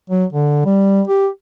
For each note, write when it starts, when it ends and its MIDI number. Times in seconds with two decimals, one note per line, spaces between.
0.10 0.25 54
0.33 0.61 50
0.65 1.01 55
1.07 1.28 67